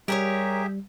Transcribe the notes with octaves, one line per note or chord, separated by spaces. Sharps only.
G3 G4 G#4 A#4 B4 C#5 E5